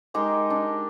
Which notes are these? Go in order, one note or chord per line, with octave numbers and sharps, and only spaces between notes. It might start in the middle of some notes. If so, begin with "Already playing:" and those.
G#3 D#4 G4 A#4
D4